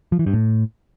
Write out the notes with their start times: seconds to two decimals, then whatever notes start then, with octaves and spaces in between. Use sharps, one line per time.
0.12 F3
0.19 E3
0.26 G2
0.34 A2